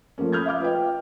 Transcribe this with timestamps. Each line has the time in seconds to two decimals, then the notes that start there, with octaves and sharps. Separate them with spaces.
0.18 F3 A3 A#3 C#4
0.32 B5 D#6 F6 G6 G#6
0.46 E5 F5 D6 F6
0.60 F4 B4 D#5 G5